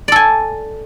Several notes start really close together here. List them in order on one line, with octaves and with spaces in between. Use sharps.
D5 A4 G#5